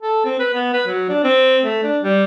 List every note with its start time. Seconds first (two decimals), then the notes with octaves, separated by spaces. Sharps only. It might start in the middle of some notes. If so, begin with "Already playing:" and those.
0.02 A4
0.25 C4
0.39 B4
0.54 B3
0.73 B4
0.86 F#3
1.09 D4
1.24 C4
1.63 A3
1.83 D4
2.02 G3